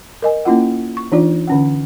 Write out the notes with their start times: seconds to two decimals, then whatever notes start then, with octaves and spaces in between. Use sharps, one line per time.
0.22 A#4 D#5 G#5
0.45 A#3 C#4 E4 F4 F#5
0.97 C#6
1.12 E3 D4 D#4 F4 D5
1.47 D3 C#4 F#5